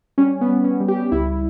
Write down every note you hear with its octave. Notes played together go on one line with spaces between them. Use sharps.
G3 C#4
B3
G3
C#4
G3
G4
C#2 E4